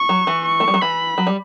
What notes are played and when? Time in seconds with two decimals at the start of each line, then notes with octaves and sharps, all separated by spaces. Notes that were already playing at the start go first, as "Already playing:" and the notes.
Already playing: C#6
0.09 F#3
0.27 E3
0.46 C#6
0.60 A3
0.68 G3
0.74 F#3
0.82 E3 B5
1.18 F#3
1.27 G3